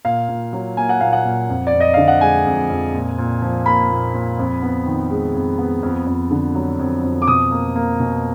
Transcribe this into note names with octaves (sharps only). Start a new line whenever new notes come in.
A#2 F5
A#2
F#3
A#3 G#5
F#5
A#2 F5
F#5
A#2
F2
D5
F2
D#5
D3 F5
F#5
G#3 G#5
F2
F2
A#2
A#2
F3
A#3 B5
A#2
A#2
F2
B3
D#3
G#3
F2
B3
F2
F2
D3
F#3
F2
F2
D6
B2 D#6
A#3
A#3
B2